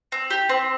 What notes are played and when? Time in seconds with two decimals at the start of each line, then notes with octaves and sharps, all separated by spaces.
0.12 C4
0.30 G4
0.49 C4